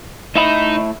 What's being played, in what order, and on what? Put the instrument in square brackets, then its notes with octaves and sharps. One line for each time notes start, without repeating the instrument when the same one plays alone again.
[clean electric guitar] A2 E5 B5 [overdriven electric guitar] D#4